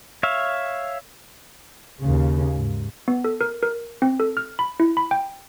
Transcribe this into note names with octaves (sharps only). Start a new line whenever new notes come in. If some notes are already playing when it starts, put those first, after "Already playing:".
C#5 E5 F5
D#2 C#3
G#2
B3
A4
A#4
A#4
C4
A4
F6
B5
E4
B5
G5